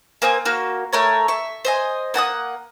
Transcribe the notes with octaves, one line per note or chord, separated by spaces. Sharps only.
A#3 C4 G#5 D#6
A#3 F#4 F6
A3 A#4 C#5
E5 C#6
C5 D#5 G#5
A#3 F#5 A5 D#6